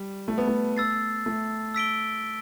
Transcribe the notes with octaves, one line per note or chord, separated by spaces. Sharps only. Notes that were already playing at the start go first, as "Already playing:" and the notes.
Already playing: G3
A3
B3
A3
E6 A6 C7
A3
E6 B6 D7 G7